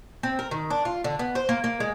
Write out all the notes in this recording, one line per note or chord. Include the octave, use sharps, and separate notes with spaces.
C4
A#4
D#3
D4
F4
D3
B3
C5
A#3
A#3
G#3